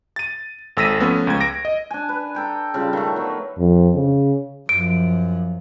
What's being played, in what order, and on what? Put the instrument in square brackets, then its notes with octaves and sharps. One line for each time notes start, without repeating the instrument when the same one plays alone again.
[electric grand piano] A6 D#7
G#1 A4 E6 A#6 B6 D#7
F3 A3 B3 C#4
C#2 G#6
A#6 D7
D#5
[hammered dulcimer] D4 G#5
B4
A4 G5 A#5
C#3 G3 F4
D#3 A3
F#3 B3
[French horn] F2
C#3
[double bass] F#2 F3 [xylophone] D7